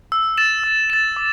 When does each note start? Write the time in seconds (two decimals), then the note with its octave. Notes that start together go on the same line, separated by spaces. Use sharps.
0.12 E6
0.38 A6 E7
0.64 E6
0.90 A6 E7
1.16 D6